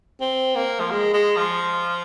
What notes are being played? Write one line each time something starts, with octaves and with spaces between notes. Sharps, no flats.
C4
A#3
F3
G#3
G#3
F3